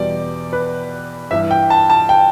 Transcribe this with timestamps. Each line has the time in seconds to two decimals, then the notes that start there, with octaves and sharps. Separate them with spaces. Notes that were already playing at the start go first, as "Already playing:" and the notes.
Already playing: E2 B2 G3 D5
0.53 B4
1.31 G2 E3 G3 E5
1.51 G5
1.70 A5
1.90 A5
2.09 G5